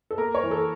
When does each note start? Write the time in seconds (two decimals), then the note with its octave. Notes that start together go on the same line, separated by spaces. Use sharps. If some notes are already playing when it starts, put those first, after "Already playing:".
0.11 A4
0.18 A#3 A#4
0.35 C#5
0.43 E3
0.51 A4